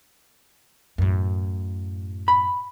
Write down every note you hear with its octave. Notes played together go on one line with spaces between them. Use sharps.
F#2 A2
B5